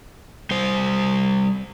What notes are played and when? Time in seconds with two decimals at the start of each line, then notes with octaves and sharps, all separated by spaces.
0.51 G3 C5